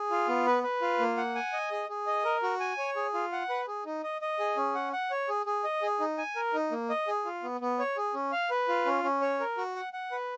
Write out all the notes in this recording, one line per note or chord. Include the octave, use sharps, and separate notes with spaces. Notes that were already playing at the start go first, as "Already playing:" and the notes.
Already playing: G#4
F4
B3
B4
B4
F4
A#3
F#5
G#5
D#5
G#4
G#4
D#5
A#4
F#4
G#5
C#5
G#4
F4
F#5
B4
G#4
D#4
D#5
D#5
G#4
C#4
F#5
F#5
C#5
G#4
G#4
D#5
G#4
D#4
G#5
A#4
D#4
A#3
D#5
G#4
F4
B3
B3
C#5
G#4
C#4
F5
B4
F4
C#4
C#4
C#5
A#4
F#4
F#5
F#5
B4